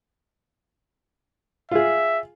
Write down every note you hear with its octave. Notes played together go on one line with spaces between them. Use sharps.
F4 G#4 E5